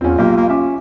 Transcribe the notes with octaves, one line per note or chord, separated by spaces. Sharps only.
E2 C4 C#4 F4
B1 A#3 G4
A#3
C#4 E5 D6